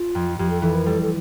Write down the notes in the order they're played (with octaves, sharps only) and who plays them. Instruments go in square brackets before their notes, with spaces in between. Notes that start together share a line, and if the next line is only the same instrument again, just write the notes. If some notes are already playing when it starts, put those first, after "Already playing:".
Already playing: [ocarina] F4
[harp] F2
[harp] F2 [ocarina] G4
[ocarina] A4
[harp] E3 [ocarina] A4
[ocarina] A#4
[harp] G3 [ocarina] A4
[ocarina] A4